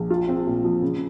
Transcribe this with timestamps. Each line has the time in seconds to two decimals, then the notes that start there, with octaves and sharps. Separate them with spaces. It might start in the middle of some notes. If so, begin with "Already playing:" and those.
Already playing: A#1
0.10 F4
0.29 C4
0.47 A#2
0.64 F3
0.82 C#3